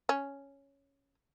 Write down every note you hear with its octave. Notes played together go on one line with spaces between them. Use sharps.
C#4